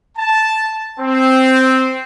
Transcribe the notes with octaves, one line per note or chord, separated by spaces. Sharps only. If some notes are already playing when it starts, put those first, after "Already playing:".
A5
C4